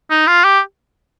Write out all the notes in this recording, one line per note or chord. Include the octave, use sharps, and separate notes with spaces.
D#4
F4
G4